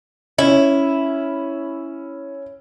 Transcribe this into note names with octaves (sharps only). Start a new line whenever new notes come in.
C#4 E4